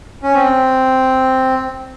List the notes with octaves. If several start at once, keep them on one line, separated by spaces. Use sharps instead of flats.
C#4
C4